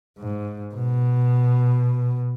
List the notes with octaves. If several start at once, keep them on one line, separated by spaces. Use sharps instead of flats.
G#2
B2